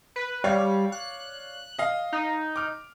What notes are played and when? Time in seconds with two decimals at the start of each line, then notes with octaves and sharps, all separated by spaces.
0.16 B4
0.44 G3 C#5 D5 F5
0.92 F#6
1.79 D#5 F5
2.12 D#4
2.56 D6 F6